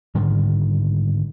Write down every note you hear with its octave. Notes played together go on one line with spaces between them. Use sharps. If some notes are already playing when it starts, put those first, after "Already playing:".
G#2 D3 D#3 G3